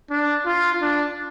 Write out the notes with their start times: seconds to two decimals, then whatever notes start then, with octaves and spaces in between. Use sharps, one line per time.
0.10 D4
0.46 F4
0.82 D4